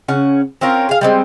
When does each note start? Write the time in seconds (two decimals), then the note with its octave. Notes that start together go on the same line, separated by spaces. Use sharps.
0.08 C#3 C#4 F#5
0.61 C4 C#4 F4 A#4
0.89 G#4 F5
1.01 G3 G#3 C4